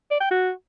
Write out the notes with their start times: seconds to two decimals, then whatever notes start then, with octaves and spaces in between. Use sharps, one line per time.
0.11 D5
0.21 G5
0.31 F#4